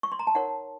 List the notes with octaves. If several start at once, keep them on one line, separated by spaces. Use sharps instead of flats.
C#6
C6
A#5
A5
D#4 A#4 C#5 F#5